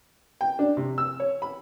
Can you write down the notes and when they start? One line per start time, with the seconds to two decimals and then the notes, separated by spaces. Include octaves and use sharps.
0.41 G5
0.59 D4
0.77 C3
0.98 E6
1.20 C#5
1.42 B5